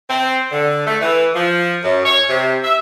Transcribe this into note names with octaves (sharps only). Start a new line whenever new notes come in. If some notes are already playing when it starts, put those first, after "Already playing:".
C4
D3
A3
E3
F3
F#2
C#5
C3
E5